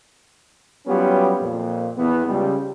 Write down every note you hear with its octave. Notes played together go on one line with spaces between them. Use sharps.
F#3 G3 B3 C#4 F4 G4
F2 A#2
E2 B3
C#2 G3